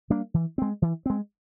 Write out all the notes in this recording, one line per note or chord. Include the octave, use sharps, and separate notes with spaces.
G3 A#3 D4
E3
G#3 C4
E3
G#3 C4